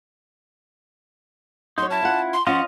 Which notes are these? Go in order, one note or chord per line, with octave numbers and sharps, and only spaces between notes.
F#3 D#4 C#5 C6
C#4 E4 A5
F4 F#5
C6
F3 C#4 F4 D#5 F5 F#5 C6